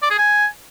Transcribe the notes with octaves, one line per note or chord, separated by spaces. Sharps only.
D5
G#4
G#5